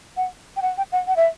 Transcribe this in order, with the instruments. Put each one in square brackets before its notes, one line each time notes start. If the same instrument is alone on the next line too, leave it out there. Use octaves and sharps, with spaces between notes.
[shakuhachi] F#5
G5
F#5
G5
F#5
F#5
E5